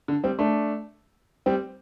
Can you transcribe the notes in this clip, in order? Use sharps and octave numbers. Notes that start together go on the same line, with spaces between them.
D3
G3 C4
A3 D4
G3 C4